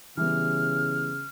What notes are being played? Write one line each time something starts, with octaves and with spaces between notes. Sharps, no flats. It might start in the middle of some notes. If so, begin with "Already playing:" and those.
C#3 E3 G3 B3 F6